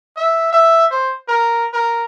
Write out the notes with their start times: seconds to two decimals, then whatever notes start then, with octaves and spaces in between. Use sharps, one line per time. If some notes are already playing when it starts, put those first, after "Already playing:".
0.17 E5
0.53 E5
0.91 C5
1.28 A#4
1.73 A#4